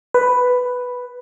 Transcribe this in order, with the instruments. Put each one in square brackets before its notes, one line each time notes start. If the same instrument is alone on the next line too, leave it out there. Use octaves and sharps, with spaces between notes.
[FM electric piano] B4